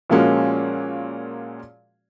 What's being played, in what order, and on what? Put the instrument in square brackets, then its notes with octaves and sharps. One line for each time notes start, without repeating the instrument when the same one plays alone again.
[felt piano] A#2 F3 G#3 A#3 C#4 F#4